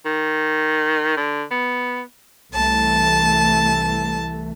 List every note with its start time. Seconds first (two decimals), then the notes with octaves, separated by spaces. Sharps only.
0.05 D#3
1.17 D3
1.51 B3
2.54 C2 E3 A3 A5